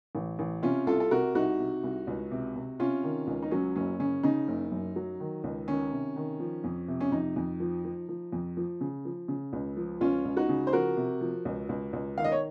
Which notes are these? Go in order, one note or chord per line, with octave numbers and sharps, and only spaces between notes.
A1
A1
C3 C#4 F4
C2 F4 A4
A4
C3 F#4 A#4
C2 D#4 F#4
C3
C2
C#2
C3
C3
C3 C#4 F4
D#3
C#2
D#4
F#3 C#4
F#1 C#4
C#3 C#4
C#3 D#4
F#1
F#2
F#3
D#3
C#2
D#3 C#4
C3
D#3
F3
F2
C3
C#4
F2 D#4
F2
F3
F3
F3
F2
F3
C#3
F3
C#3
C#2
F3
C#2 C#4 F4
C#2
D#4 F#4
C#3
C5
F3 F#4 A#4
C3
F3
C#2
C#2
C#2
D#3 F5
D#5
C#5